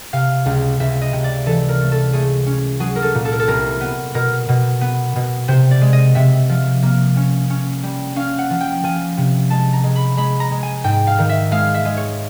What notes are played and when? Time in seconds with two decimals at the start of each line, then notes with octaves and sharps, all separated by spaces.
0.13 C3 F5
0.46 C#2
0.80 C#2 E5
1.01 D#5
1.13 C3
1.24 D5
1.46 E3 A4
1.69 A#4
1.81 A3
1.92 A4
2.13 A3 G#4
2.46 C#4
2.80 F#3 G#4
2.96 A#4
3.02 A4
3.15 A#2
3.25 A4
3.32 A#4
3.40 A4
3.47 C2 A#4
3.81 B3
4.14 B2 A#4
4.49 B2
4.81 B3
5.16 B2
5.48 C3 C5
5.71 D5
5.81 G#3
5.93 D#5
6.15 C3 E5
6.49 F3
6.83 A#3
7.17 C#4
7.50 C#4
7.83 G3
8.16 C#4 F5
8.38 F#5
8.50 F3
8.61 G5
8.84 F3 G#5
9.17 C3
9.50 G#3 A5
9.73 A#5
9.83 G#3
9.96 B5
10.17 G#3 B5
10.40 A#5
10.52 G#3
10.63 G#5
10.84 G#2 G5
11.07 F5
11.18 D#3
11.29 E5
11.52 G#3 F5
11.74 E5
11.85 G#3
11.97 C#5